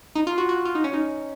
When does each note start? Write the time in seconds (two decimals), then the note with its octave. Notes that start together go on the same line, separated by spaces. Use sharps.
0.15 D#4
0.27 F4
0.38 F#4
0.49 F#4
0.65 F4
0.75 D#4
0.84 C#4
0.93 D#4